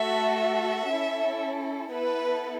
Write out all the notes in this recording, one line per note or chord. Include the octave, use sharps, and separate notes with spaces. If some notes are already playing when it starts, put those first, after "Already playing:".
Already playing: A3 F#4 A4 E5
E5
C#4 E4 A4
B3 E4 A4 B4